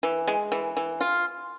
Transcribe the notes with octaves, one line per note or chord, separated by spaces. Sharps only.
E3
G#3
E3
E3
F4